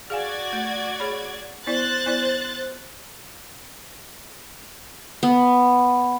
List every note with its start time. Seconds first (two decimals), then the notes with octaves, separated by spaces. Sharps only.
0.10 F#4 G#4 D5 F5 G#5 G#6
0.53 A3
1.00 G#4 C#5 B5
1.67 B3 E4 C5 D5 F#6 A6
2.06 B3 E4 D5
5.23 B3